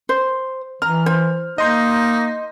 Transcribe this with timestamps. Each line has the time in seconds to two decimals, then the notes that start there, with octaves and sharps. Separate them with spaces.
0.09 C5
0.82 E3 A#5 F6
1.06 C5
1.58 A#3 D#4 D#5 C6 G6